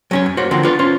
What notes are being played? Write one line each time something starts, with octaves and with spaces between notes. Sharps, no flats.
F#3 C#4 C#5
F#2
A#3 F#4 C5 C#5
D3 F3 A#3 C4
D4 F4 A4 B4
C#4 F4 C5